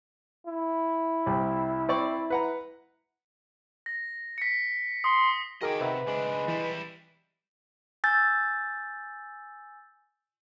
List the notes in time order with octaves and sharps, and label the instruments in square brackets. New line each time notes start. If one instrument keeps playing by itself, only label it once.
[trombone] E4
[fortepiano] C2 G3
C4 D5 C#6
B4 F#5 A#5
[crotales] A#6
B6 C#7
[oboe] C6 [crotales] D#6
[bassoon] D#3 [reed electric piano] F#4 A#4 D6 [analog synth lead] G#4 [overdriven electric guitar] D#5 G5
[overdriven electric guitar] C3 [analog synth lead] B4 [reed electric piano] C5 E5 F#5
[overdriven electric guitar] C#2 D4 [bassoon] G#3
[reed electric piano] E3 [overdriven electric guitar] G3 E4
[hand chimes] G#5 E6 G6 A6